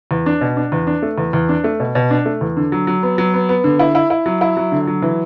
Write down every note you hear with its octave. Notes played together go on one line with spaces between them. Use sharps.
E2
D4
B2
D4
E2
D4
A3
E2
E2
D4
A3
B2
B2
D4
A3
E2
D3
F#3
F#3
B3
F#3
B3
B3
D3
E4
E4
E4
F#3
E4
F#3
D3
F#3
E3